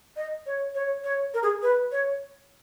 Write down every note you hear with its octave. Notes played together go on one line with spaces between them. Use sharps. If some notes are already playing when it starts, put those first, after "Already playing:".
D#5
C#5
C#5
C#5
A#4
G#4
B4
C#5